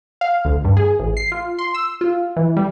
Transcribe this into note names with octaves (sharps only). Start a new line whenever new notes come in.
F5
D2
G2
G#4
A1
C7
F4
C6
E6
F4
E3
G3